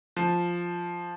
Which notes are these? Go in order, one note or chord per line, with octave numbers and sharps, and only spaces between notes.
F3